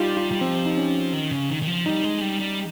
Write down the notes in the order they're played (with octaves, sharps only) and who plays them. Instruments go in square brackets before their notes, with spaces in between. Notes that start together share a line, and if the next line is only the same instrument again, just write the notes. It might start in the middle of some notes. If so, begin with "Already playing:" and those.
Already playing: [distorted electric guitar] G3 [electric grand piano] D#4 F4 G4
[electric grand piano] F4
[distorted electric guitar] G3
[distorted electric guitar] F3 [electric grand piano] C4
[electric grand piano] D#4
C#4
[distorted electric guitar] D#3
C#3
D#3
D#3
F3
[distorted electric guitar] G3 [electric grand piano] D#4
[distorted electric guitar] G#3
G3
G3